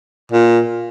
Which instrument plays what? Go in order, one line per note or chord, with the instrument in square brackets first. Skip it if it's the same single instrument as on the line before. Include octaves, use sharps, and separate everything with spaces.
[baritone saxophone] A#2